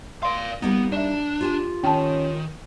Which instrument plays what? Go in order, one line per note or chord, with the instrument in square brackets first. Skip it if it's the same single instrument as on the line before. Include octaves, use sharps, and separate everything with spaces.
[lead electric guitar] D5 F5 [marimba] C6
[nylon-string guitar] G3 A#3 D#4 [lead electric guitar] B3
[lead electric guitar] D4 [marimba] D5 E5
[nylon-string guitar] F4 G4 G#5
[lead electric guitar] D#3 [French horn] C#4 [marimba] G5 A5